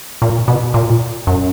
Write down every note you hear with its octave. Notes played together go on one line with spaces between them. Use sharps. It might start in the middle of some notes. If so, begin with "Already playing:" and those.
A#2
B2
A#2
F#2